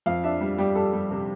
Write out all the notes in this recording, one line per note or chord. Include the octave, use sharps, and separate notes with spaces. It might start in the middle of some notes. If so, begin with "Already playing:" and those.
F2 F5
D4 E5
G3
G3 G4
G3 A4
G3
C3